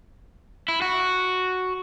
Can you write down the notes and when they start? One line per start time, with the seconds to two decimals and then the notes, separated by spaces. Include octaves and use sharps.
0.68 E4
0.82 F#4